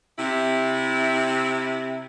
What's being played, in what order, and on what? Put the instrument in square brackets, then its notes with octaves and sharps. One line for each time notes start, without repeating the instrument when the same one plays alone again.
[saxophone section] C3 E4